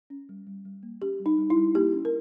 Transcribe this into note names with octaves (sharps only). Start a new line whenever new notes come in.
C#4
G3
G3
G3
A#3
C#4 G4
G3
D#4
G3
E4
G3
A#3 G4
C#4
A#4